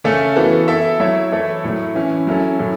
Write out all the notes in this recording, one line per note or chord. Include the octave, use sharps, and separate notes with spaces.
C#3 A3 C#4 A4 E5
E3 B3 F#4 A4
B3 E4 A4 E5
F#3 A3 E4 C#5 E5
E3 A3 E4 A4 C#5
A2 F#3 A3
E3 C#4 E4
F#3 C#4 E4 A4
A2 F#3 C#4 A4